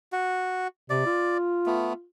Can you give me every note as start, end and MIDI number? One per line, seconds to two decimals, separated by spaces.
0.12 0.68 66
0.90 1.03 48
0.90 1.38 74
1.06 2.04 65
1.66 1.93 57
1.66 1.93 59